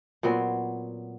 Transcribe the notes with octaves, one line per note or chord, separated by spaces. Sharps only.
A#2 F#3 B3 C4